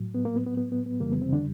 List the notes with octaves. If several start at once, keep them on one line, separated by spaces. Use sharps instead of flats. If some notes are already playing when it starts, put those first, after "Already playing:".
Already playing: A2 F#3
B3
A#3
B3
B3
B3
B3
B3
F2 C#3 E3 G3 A#3
B3
C3 C4
D3 D4